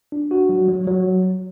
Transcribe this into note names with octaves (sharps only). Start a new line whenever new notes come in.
D4
F#4
F#3
F#3
F#3